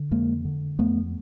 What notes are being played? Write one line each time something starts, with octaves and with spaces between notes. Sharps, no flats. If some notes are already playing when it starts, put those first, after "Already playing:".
Already playing: D3
F2 G#3 A#3
D3
F2 A3 B3